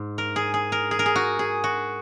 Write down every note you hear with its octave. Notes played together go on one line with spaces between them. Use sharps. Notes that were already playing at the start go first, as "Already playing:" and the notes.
Already playing: G#2
A#4
G#4
G#4
A#4
G#4
A#4
G#4
F#4
G#4
F#4